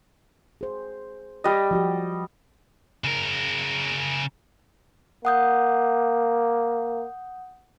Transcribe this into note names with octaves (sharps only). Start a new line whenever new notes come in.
G#4 C5
G3 D#5
F3 F#4 G4
C#3 A#4
A#3 F#5 D#6 G6